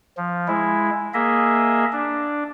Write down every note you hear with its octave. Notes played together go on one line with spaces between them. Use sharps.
F3
G#3 E4
A#3 G#4 D#5 E5
D4